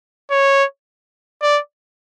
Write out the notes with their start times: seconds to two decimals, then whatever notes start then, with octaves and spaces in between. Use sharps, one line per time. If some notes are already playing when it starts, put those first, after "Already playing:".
0.31 C#5
1.42 D5